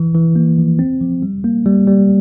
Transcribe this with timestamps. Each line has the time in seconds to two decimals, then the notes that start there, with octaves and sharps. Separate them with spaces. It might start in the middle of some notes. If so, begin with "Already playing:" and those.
Already playing: E3
0.15 E3
0.36 A#3
0.58 F3
0.79 C4
1.01 F3
1.22 G3
1.44 A#3
1.66 G3
1.88 G3